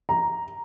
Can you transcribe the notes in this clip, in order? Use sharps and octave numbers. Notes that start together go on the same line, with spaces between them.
A#5